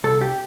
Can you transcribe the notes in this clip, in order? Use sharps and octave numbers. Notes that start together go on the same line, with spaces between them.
C2 A4
G4